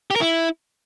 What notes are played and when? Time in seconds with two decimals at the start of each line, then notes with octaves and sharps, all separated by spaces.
0.10 G4
0.16 A#4
0.21 E4